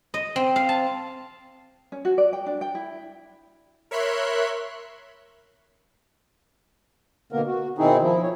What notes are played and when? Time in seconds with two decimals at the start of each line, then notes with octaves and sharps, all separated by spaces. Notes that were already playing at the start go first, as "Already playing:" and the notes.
0.14 D#5
0.36 C4
0.56 F5
0.69 A5
1.92 C#4
2.05 F#4
2.18 D5
2.33 G5
2.46 D4
2.61 G5
2.75 E4
3.91 A#4 C#5 E5 B5 C6 F#6
7.32 B2 D3 A#3 B3 A#4
7.46 F#4
7.78 B2 D#3 C4 D#4 E4 G#4
8.02 F3 E4
8.22 C#5